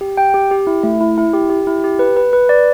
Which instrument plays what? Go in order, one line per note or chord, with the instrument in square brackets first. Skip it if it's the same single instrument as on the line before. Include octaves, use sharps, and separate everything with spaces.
[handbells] G4
G5
G4
G4
E4
A3
E4
E4
G4
G4
E4
G4
B4
B4
B4
D5